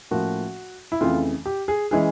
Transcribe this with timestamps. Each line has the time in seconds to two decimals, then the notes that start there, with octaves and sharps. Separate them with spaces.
0.11 A2 F3 A#3 C#4 F#4
0.92 E4
1.01 F2 C#3 E3 A3 F4
1.46 G4
1.68 G#4
1.91 E3 G#3 C#4 G#4